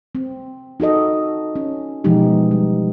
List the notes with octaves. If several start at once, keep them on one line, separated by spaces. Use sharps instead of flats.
C4
D#4 F#4 A4 D#5
C#4
B2 E3 F3 G#3 D#4 G4
G3